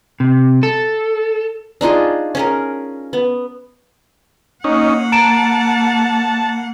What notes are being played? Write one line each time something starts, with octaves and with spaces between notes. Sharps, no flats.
C3
A4
D4 D#4 F4 G#4
C#4 G#4 A#4
B3
A#3 C#4 D#4 F#5
A5 A#5 D7 E7